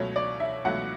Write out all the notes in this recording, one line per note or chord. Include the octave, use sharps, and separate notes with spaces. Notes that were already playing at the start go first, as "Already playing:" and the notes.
Already playing: C#2 B2 F#3 A3 C#5
D5
E5
C#2 B2 F#3 A3 F#5